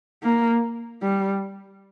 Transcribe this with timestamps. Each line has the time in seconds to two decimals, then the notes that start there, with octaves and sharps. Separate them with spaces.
0.23 A#3
1.02 G3